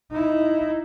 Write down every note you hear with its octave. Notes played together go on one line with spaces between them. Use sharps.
D#4 E4